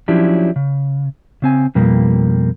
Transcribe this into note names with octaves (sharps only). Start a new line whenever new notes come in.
F3 F#3 C#4 D4 E4 G4
C#3
C#3 C4 G#5
F2 B2 G3 A#3